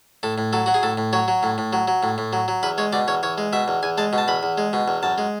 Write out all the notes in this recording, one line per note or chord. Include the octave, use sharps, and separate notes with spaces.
A2 A4
A2
F#3 A4
F#3 F#4
G#4
A2 A4
A2
F#3 C#5
F#3
A2
A2
F#3
F#3
A2
A2
F#3
F#3
E2 B4
G#3 C#5
B2 D5
E2 C#5
E2 C#5
G#3
B2 E5
E2
E2 G#5
G#3 A5
B2
A5
E2 B5
E2
G#3
B2
E2
F#2 A5
G#3